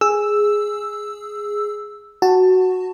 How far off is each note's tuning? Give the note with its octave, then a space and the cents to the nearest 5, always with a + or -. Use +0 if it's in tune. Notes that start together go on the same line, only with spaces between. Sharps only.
G#4 +0 E6 +0
F#4 +0 A5 +15